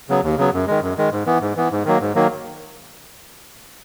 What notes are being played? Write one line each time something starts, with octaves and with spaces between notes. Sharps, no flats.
C#3 F#3 B3
D#2
C#3 F#3 B3
F#2
D#3 G#3
F#2
D#3 G#3
G#2
E3 B3
G#2
E3 B3
G#2
D#3 F#3 A#3
G#2
D#3 F#3 A#3